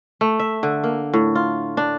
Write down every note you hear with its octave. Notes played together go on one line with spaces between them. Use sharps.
A3
E5
D3
A#3
A2
F4
D4